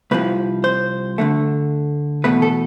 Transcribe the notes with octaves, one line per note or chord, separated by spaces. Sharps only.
C2 C3 F3 B4
C5
D2 D3 A3
E2 B2 A3 B4
A4